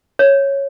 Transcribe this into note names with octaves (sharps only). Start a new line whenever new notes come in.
C#5